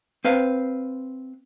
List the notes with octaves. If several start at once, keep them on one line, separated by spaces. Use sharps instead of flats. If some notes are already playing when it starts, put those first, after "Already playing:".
C4 B4 F5